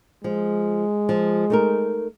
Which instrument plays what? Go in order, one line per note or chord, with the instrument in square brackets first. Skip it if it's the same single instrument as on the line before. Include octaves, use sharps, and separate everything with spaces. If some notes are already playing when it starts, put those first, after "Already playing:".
[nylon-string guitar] F3 [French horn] G#3
[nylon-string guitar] F3
A3 D#4 A#4